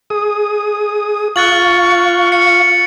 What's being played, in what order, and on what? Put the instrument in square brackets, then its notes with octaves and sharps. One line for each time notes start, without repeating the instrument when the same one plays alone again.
[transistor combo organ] G#4 D#6
[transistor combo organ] F4 F5 [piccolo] C#6 [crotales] F#6 A6 F#7
[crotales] C#7